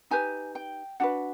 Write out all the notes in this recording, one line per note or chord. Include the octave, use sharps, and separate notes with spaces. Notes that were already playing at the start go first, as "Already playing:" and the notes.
D#4 G4 B4 G#5
G5
D4 F#4 B4 F#5